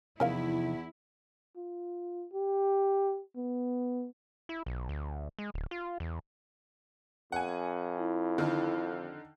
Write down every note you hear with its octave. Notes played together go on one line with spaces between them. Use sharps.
E2 C3 F3 C#4 D#4 E4 A#4 F5
F4
G4
B3
E4
B1
D2
G#3
D1
F4
E2
F2 F#5 G#5
E4
D3 D#3